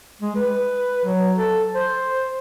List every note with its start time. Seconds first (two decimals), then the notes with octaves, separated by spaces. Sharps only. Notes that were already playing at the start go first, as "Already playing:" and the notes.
0.21 G#3
0.36 B4
1.05 F#3
1.36 A4
1.75 C5